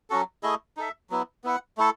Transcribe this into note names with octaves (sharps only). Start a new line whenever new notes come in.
F#3 C#4 F#4 A4
A3 E4 G#4 D#5
D#4 A4 E5
F#3 B3 E4
B3 E4 B4 F#5
A3 E4 A4